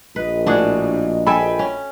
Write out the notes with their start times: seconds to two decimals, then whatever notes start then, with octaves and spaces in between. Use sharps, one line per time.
0.16 A#1 B4 D#5
0.47 A2 D4 F#4 G#4
1.27 A4 E5 G5 G#5 B5
1.59 C#4